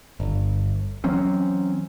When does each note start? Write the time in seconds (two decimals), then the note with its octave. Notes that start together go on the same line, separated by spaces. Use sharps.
0.20 G1
1.04 E3 F#3 C4 C#4